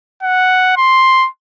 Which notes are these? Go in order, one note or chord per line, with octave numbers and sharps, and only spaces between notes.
F#5
C6